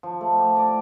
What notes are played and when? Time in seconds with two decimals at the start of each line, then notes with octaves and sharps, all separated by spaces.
0.03 F3
0.21 A3
0.38 G4
0.56 D5